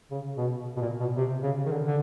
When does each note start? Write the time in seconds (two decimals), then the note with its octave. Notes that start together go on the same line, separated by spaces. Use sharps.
0.11 C#3
0.37 B2
0.77 B2
0.81 A#2
1.00 B2
1.17 C3
1.43 C#3
1.66 D#3
1.70 D3
1.86 D3